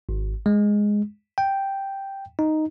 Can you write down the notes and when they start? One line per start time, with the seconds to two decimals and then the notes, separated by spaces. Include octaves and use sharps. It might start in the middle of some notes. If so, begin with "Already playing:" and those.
0.09 G#1
0.46 G#3
1.38 G5
2.39 D#4